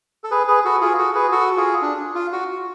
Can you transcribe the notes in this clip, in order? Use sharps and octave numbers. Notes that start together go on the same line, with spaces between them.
A4
G#4 B4
G#4 B4
F#4 A4
F4 G#4
F#4 A4
G#4 B4
F#4 A4
F4 G#4
D4
F4
F#4